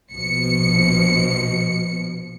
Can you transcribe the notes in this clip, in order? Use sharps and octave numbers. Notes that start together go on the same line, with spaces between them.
A#1 B2 F3 C#7